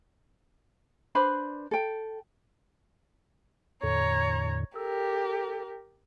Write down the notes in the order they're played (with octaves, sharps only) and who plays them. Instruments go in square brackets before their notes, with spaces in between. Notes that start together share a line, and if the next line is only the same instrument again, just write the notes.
[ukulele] D4 B4 C5 B5
A4 G5
[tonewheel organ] E2 A2 D3 [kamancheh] C#5 A#5
[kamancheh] G4 A#4 [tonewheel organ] A4